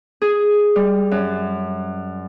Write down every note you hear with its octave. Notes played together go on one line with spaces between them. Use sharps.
G#4
G3
F#2